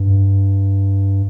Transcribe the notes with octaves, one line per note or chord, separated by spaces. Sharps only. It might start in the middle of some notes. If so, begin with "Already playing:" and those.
Already playing: G2